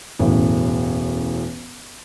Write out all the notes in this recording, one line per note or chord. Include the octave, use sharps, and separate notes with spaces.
E1 A1 F#2 A2